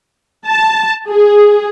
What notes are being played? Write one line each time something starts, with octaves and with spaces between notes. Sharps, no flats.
A5
G#4